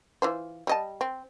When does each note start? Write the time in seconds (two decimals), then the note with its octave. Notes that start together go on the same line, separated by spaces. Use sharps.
0.22 E3 F4 C5
0.67 G3 D#5 A5
1.01 C4